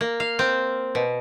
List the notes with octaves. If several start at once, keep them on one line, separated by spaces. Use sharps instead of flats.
A#3
F5
C4
B2